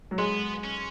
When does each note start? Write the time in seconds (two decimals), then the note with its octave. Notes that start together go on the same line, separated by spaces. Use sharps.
0.11 F#3
0.18 G#3 B3
0.64 C#4